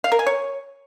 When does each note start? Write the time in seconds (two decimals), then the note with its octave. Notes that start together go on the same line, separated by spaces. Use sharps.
0.04 F5
0.12 A#4
0.19 G#5
0.27 C#5